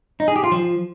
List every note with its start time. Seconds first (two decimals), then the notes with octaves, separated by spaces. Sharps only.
0.20 D#4
0.28 G#4
0.36 G4
0.44 F4
0.52 F3